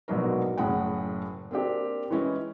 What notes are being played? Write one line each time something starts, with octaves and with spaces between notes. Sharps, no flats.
A#1 G#2 B2 F#3 F#4 A#4
F#1 A2 G#4 F#5 G5
A#3 C4 D4 G4
E3 G#3 C#4 E4